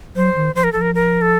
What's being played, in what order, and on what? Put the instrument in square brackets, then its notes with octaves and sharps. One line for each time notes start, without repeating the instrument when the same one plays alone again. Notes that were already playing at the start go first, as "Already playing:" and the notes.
[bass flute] F#3 [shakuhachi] C5
[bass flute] D#3
[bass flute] F3 [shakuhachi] C5
[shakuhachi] A#4
[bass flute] F3 [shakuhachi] A4
[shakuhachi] A#4
A#4
A4